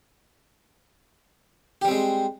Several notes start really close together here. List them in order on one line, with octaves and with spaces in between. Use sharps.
G4 G3 C4 G#3